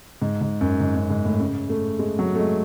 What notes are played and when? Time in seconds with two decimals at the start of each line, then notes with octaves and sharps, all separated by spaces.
0.22 G#2
0.41 G#2
0.61 F#2
0.80 G#2
0.96 F#2
1.10 G#2
1.25 A2
1.40 C#3
1.70 A3
1.99 G#3
2.19 F#3
2.35 A3
2.39 G#3